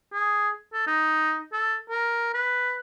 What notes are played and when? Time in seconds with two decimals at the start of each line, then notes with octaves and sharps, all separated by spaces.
0.14 G#4
0.73 A4
0.87 D#4
1.53 A4
1.90 A#4
2.34 B4